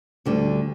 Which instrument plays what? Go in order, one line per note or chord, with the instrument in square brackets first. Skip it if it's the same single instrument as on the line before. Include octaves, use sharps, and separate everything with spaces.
[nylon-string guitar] D2 D3 G3